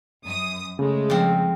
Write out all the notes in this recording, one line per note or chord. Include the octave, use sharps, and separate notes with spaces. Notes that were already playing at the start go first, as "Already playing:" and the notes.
F#2 D#6
C#3 G#3 A3
F2 C4